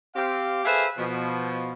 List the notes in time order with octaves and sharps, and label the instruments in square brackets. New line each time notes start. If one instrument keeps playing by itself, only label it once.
[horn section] C4 G4 F5
G#4 A4 B4 C5 E5 F5
B2 F3